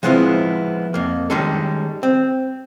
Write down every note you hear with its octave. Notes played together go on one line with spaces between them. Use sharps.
F3 G#3 B3 C4 E4 F4
F2 A#3
D#3 G3 G#3 C#4 A4
C4